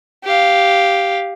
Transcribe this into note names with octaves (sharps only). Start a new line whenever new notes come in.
G4 F5